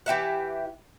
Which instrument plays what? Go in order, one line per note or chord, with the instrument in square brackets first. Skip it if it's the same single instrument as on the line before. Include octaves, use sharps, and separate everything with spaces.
[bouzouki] E3 G4 E5 F#5